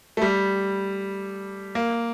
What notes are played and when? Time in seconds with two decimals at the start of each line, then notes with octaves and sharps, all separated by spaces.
0.17 A3
0.22 G3
1.75 A#3